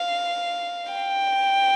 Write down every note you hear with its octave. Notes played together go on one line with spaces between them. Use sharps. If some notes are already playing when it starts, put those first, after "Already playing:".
Already playing: F5
G5